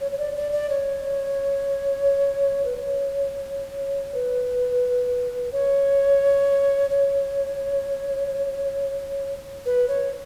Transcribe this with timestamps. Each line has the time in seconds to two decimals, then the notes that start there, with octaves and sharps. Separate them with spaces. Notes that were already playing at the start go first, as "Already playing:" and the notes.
0.01 C#5
0.11 C#5
0.18 D5
0.36 D5
0.52 D5
0.70 C#5
2.65 B4
2.76 C#5
4.14 B4
5.52 C#5
6.90 C#5
9.66 B4
9.88 C#5